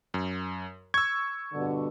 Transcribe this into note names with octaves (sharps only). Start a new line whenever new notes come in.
F#2
C#6 E6 G#6
G2 B2 D3